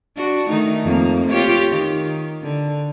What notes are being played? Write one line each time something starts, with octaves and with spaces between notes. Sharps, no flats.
D4 F#4
D#3 A3 D#4
F2 A#3
F4 G4 C#5
D#3
D3